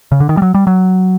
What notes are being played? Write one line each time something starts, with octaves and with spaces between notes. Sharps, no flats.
C#3
D3
D#3
G3
F#3
G3
F#3